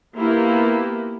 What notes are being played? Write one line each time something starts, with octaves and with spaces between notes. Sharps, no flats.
A#3 B3 E4 F4 G4